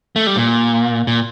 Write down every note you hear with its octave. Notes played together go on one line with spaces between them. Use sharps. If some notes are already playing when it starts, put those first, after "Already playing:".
A3
G3
A#2
A#2